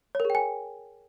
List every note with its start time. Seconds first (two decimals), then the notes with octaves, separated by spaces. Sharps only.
0.15 C#5
0.20 A#4
0.25 G#4
0.30 G5
0.35 G#5